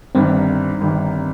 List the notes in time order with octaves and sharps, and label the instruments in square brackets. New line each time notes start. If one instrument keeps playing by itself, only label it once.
[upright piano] G1 G2 D#3 [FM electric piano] C4
[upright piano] G1 G2 D#3